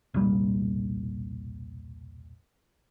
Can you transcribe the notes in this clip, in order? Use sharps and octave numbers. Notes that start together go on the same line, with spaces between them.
E1 C2 A#2 G3